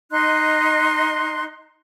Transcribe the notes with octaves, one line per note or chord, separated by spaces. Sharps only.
D#4 D#5 C6 F#6